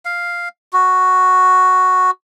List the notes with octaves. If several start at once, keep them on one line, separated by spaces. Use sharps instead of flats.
F5
F#4